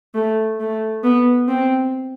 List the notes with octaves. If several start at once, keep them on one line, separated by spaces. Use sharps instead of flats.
A3
A3
B3
C4